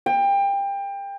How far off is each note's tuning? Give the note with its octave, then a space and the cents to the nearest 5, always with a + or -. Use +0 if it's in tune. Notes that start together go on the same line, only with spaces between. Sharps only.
G5 +25